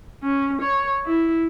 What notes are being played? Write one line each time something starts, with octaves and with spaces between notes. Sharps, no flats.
C#4
C#5
E4